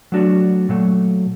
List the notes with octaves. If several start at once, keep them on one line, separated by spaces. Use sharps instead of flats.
F#3 A3 D4 F#4
A#2 F#3 A3